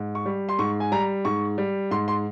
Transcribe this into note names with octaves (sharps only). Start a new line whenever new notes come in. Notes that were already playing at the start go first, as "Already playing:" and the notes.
Already playing: G#2
C#6
G3
C6
G#2 C#6
G#5
G3 A#5
G#2 C#6
G3
G#2 C6
C6